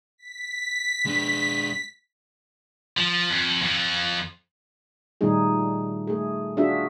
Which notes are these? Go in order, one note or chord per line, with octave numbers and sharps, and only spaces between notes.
B6
G#3 D4
F3
F2
F2 F3
A#2 D#3 G3 A3 D#4 G#4
A3 G#4
D4 F4 F#4 G#4 A4 E5